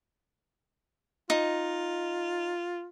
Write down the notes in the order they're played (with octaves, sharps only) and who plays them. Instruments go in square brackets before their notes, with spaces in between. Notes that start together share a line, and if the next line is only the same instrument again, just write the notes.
[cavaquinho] D#4 [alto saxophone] F4